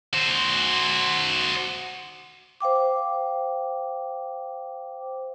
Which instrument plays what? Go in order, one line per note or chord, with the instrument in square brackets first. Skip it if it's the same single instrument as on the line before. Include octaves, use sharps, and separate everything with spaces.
[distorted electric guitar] F#4 C5
[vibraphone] C5 F5 G5 D6